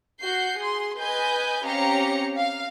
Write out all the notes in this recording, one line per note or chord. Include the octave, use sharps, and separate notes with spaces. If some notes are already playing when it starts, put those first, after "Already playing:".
F#4 G6 C7
G#4 C6
B4 D#5 G#5 G6
C4 C#4 G4 F5 A#5 C#7
F5